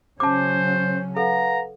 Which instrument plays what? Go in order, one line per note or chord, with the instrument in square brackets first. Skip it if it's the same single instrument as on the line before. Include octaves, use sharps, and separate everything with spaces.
[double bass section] C#3 F#3 C#4 [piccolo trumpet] C5 [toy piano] A5 D6
[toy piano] A4 [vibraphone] B4 F5 F#5 [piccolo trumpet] A#5